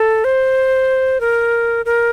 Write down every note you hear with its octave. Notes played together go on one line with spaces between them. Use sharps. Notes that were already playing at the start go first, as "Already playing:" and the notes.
Already playing: A4
C5
A#4
A#4